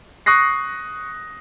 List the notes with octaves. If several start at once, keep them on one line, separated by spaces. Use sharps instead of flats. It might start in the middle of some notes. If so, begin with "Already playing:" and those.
C#6 D#6 F#6 A#6 C7